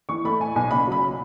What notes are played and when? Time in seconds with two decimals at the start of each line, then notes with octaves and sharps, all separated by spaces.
0.09 E3 C#6
0.24 A3 B5
0.40 A2 G#5
0.56 B1 G#5
0.71 C#3 B5
0.87 F#3 B5